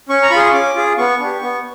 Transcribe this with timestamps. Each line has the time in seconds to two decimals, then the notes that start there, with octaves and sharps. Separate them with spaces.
0.09 C#4 C#6
0.23 A#5
0.30 F4 B5
0.36 G#4 C6
0.46 C#6
0.53 C#4 D6
0.75 F4 G#4
0.98 B3 C#6
1.20 D4 G4
1.42 B3